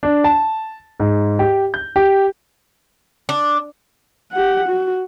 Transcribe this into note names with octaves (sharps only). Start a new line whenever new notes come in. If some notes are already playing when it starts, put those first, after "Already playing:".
D4
A5
G#2
G4
G6
G4
D4
G4 F#5
F#4